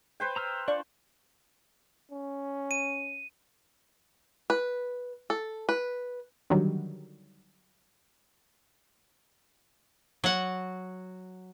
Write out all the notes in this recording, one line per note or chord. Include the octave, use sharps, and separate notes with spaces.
B4 C5 G5
A#5 E6 F6
D4 F4 D5 C#6
C#4
D#7
B4
A4
B4
D3 D#3 F#3 G3
F#3 F#5